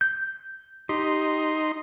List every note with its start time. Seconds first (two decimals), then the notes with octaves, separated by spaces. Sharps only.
0.01 G6
0.89 D#4 G4 C6